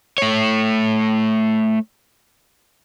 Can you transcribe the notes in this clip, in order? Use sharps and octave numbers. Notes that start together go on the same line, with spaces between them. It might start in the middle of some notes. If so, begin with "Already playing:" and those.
A3 C#5